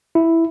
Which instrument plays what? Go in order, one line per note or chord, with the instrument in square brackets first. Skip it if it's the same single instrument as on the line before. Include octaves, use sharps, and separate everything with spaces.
[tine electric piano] E4